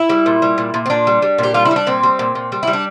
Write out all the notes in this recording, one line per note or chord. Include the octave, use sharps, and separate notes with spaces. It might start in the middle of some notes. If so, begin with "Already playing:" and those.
Already playing: E4
G3
A#2
G3
A#2
A#2
C4
A#2 D4
G3
G3
A#2 G4
G3 F4
E4
G3
D4
A#2 C4
G3
A#2
A#2
G3
G3 E4
D4